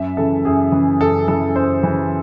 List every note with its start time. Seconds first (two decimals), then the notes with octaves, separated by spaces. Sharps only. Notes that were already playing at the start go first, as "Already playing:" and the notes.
Already playing: F#2 E5
0.17 C#3 E3 A4
0.45 F#2 G#4
0.72 C#3 E3
1.00 F#2 A4
1.28 C#3 E3 A4
1.55 F#2 C5
1.83 C#3 E3